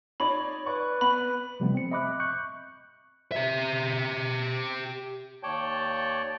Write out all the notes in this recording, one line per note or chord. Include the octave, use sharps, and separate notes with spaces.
D#4 C#5 D5 B5
B4 D5 C#6
B3 B5
C3 F3 G3 A3 B3 C4
C4 C#7
D#5 E5 B5 D6 F#6
C#6 F#6 G6 C#7
G4 E5
D#2 C#5 D5 G5 A5 G6